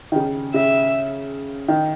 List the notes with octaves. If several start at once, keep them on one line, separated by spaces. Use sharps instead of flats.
D#3
C#3
C#3 E5
D#3